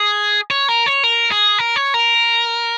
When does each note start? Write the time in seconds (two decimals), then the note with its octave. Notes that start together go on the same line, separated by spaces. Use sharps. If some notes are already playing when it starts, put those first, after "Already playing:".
Already playing: G#4
0.50 C#5
0.68 A#4
0.86 C#5
1.04 A#4
1.32 G#4
1.58 A#4
1.76 C#5
1.94 A#4